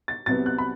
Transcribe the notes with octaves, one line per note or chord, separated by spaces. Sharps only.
A6
C2 C3 F#3 B3 A6
F#6
B5